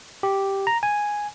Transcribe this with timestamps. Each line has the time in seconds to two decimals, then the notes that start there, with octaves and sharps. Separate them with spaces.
0.23 G4
0.67 A#5
0.83 G#5